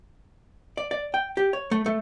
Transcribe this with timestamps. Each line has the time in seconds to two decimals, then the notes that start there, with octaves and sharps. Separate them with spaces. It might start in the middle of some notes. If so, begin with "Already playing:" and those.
0.77 D5
0.91 D5
1.14 G5
1.37 G4
1.53 C#5
1.71 A3
1.86 A3